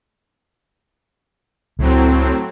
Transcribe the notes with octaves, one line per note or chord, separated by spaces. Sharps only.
C#2 A2 F#3 C4